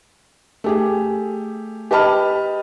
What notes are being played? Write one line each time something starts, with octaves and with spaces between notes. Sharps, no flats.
A3 G4 G#4
G4 B4 D#5 A5 B5 F6